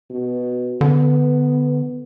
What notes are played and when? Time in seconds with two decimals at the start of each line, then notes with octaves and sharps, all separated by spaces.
0.10 B2
0.81 D3 B3